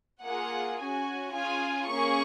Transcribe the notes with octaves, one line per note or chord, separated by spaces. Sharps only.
A#3 F4 G#4 F#5
C#4 F#4 G#5
C#4 F4 G#4 G#5
A#3 C#4 G#4 C#6